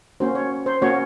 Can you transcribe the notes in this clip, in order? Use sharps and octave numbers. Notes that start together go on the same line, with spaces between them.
A#3 C#4 F#4 C5
C#5
C5
A#3 C#4 F#4 C#5